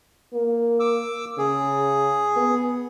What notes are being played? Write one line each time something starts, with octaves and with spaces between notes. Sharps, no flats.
A#3
D6 E6
C#3 G#4
B3